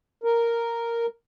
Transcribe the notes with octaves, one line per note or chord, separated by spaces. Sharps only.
A#4